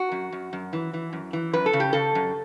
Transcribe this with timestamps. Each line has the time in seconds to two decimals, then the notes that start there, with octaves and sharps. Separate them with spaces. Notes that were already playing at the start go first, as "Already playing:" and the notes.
Already playing: F#4
0.11 F#2
0.32 F#2
0.53 F#2
0.73 E3
0.93 E3
1.13 F#2
1.33 E3
1.53 F#2 B4
1.66 A4
1.73 C#3
1.80 G4
1.93 C#3 A4
2.15 F#2